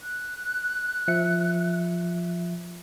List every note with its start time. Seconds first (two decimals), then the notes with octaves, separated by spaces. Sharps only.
0.02 F#6
1.08 F3 E5 C#7